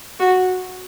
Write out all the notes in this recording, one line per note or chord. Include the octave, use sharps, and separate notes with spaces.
F#4